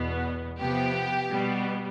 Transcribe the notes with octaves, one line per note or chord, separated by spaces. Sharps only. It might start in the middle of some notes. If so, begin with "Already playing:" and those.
Already playing: E2 B2 B3
C3 F3 B3 G4
B2 G3 B3